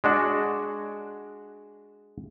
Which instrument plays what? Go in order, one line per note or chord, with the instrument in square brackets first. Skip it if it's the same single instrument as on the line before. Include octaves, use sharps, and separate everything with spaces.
[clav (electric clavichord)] G#3 D4 F#4